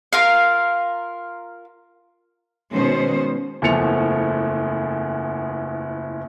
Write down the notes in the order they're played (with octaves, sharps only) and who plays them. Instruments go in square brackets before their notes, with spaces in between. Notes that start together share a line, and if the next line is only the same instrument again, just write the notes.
[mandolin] F4 A#4 F5
[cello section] B2 D#3 G#3 B3 C#4 C5
[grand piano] F#1 E2 F3 A3 C#7 F7